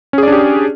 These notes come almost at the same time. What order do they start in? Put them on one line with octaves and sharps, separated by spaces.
C#4 G#4 D5 D4 G4